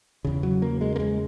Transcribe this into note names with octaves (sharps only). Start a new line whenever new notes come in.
E2 C#3
F#3
A#3
G#3
A#3
G#3